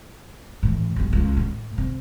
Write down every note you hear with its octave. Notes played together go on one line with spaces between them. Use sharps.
A2 E3
G1 F#2
C#2
A2
C3